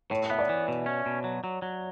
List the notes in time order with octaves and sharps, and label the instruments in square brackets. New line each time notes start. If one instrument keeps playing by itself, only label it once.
[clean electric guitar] A2 [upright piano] C#5
[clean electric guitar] B3 [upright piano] E5
[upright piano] D5
[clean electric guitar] E3
B2
C#4
B2
F#3
F#3
F#3